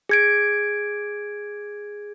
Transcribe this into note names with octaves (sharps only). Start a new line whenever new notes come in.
G#4 G#6 D7